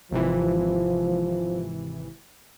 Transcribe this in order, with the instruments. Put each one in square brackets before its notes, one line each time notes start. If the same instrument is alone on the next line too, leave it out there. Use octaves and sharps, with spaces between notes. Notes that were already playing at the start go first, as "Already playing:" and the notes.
[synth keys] G#1 C3 E3 [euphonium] F3